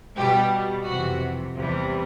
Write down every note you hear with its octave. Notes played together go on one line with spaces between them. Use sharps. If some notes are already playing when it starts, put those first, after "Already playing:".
B2 G3 G4
F2 C3 E3 F#4
E2 C3 E3 G3